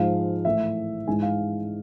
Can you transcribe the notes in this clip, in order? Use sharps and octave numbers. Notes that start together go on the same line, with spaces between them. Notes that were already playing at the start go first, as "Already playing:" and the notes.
Already playing: G#2 F3 G#3 F5
A2 E3 A3 E5
G#2 E3 G#3 G#5
F5